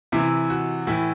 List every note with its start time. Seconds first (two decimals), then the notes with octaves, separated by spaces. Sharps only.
0.12 C3 E3 E4
0.50 F#4
0.87 A2 E3 E4